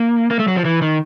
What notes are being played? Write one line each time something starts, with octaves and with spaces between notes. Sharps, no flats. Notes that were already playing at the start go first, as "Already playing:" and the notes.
Already playing: A#3
A#3
A3
F#3
F3
E3
D#3